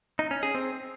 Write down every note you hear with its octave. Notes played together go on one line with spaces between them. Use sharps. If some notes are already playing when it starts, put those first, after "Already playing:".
D#4
C#4
G#4
C4